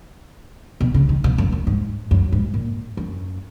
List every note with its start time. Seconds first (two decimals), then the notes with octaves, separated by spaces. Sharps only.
0.81 B2
0.94 C#3
1.09 D#3
1.24 B2
1.38 F#2
1.52 F#2
1.67 G#2
2.11 F#2
2.32 G#2
2.54 A#2
2.97 F#2